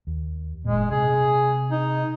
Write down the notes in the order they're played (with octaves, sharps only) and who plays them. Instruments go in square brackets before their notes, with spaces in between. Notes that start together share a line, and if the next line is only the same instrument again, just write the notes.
[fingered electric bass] D#2
[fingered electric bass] F#1 A#2 [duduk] G#3
[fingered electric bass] C3 [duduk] G#4
[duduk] D#4